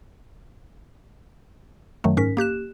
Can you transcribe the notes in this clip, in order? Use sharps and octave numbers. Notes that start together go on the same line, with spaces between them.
F#2 D#3 F#3 A3
G#2 C#4 A#4 B6
A#3 G4 F#6 E7